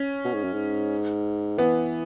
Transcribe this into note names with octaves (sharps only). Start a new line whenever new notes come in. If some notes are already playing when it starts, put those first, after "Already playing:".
Already playing: C#4
B2
G#2
F#2
G#2
E3 B3